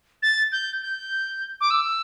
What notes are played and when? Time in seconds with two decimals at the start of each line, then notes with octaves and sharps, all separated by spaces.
0.23 A6
0.52 G6
0.82 G6
1.61 D6
1.70 E6